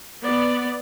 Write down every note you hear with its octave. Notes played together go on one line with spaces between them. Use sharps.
B3 D5